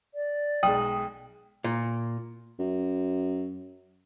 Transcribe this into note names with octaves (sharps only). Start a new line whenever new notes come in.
D5
B1 G#3 G5 D#6
A#2
F#2